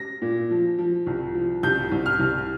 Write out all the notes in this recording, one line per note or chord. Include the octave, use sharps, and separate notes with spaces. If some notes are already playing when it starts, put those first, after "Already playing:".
Already playing: A#6
A#2
F3
F3
C2
F3
C2 G6
C2
F6
C2